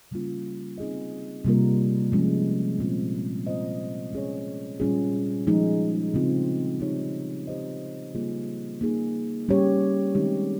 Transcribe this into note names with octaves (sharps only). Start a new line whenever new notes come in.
C#3 G3 A#3 C#4 F4
C4 D#4 G#4 D#5
C3 G3 A#3 F4 A#4
F3 G#3 C#4
A#2 G#3 C4 F4
C4 F4 C5 D#5
G#3 C#4 G#4 C#5
A#2 G3 C#4 F4 G#4
F3 G#3 D#4 G#4
C#3 G#3 C4 F4
C4 D#4 G4 C#5
C4 G4 C5 D#5
C#3 G3 A#3 F4 G#4
A#3 D#4 G#4
G3 C#4 G4 C#5
D#3 G#3 C4 D#4 G4